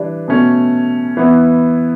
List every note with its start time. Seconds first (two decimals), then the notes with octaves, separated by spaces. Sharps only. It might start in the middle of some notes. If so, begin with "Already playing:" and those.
Already playing: E3 G3 D4
0.28 B2 A3 C#4
1.17 E3 B3 E4